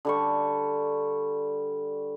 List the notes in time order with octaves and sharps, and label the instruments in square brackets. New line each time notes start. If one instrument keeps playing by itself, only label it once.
[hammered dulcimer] D3 G3 C#6